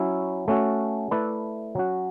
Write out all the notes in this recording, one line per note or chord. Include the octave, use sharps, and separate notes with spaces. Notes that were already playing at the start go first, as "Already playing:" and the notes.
Already playing: F#3 C#4 E4
A3 C#4 F#4 A4
A3 E4 B4 D5
F#3 C#4 F#4